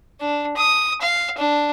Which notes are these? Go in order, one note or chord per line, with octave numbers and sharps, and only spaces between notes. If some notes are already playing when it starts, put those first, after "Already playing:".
D4
D#6
F5
D4